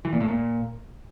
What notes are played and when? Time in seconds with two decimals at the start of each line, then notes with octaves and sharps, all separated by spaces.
0.05 E3
0.13 A#2
0.20 A2
0.28 A#2